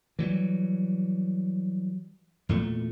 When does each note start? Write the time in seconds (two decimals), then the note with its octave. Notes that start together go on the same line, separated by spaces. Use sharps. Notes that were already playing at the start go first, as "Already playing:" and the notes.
0.19 E3 F#3 G3
2.49 E2 A#2 A3